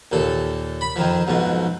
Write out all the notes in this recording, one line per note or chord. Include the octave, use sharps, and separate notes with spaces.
D#2 A#2 A4
B5
F2 D#3 F3
B1 F2 G#2 B2